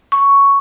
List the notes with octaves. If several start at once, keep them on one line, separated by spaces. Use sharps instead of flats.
C#6